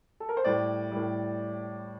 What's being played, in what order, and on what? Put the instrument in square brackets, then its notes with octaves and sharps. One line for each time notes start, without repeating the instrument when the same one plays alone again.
[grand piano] A4
A#4
C5
A2 G3 D5
A2 G3